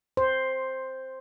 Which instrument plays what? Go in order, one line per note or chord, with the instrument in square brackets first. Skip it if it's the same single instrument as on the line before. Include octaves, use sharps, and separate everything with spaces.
[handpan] C5